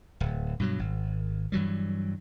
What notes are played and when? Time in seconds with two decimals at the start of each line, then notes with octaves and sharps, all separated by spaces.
0.20 D1
0.60 G2 B2 F#3
0.79 G#1
1.52 G2 E3 F#3 G3